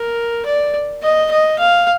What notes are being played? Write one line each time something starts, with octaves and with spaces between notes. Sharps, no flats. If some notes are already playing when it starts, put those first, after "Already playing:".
Already playing: A#4
D5
D#5
D#5
F5